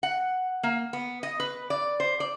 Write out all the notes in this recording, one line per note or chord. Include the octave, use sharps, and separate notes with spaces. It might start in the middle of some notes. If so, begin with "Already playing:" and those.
F#5
A#3
B3
D#5
B4
D5
C5
D5